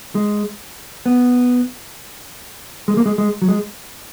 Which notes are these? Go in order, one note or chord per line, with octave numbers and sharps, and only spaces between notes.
G#3
B3
G#3
A#3
G#3
G#3
F#3
G#3